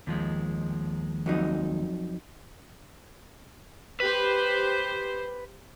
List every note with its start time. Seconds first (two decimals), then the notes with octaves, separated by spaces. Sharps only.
0.07 D#2 F3 G#3
1.26 F2 F#3 D#4
4.00 G4 B4 C5